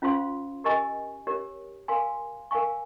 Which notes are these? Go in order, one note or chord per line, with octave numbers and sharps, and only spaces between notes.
C#4 F4 C5 F5 C6
G4 A#4 D#5 G#5 C#6
G4 A#4 C#5
A#4 F5 G#5 C6
A#4 F5 G#5 C#6